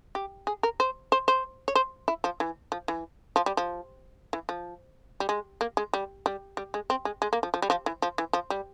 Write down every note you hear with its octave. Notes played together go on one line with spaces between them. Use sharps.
G4
G#4
A#4
C5
C5
C5
C#5
C5
E4
F3
E3
F3
E3
F3
G3
F3
E3
F3
G3
G#3
A#3
G#3
G3
G3
G3
G#3
C4
G#3
G#3
A#3
F3
F3
G3
F3
E3
F3
E3
F3
G3